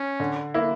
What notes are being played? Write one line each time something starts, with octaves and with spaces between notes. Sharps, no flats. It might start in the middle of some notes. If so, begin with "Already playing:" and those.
Already playing: C#4
D3
A#3 E4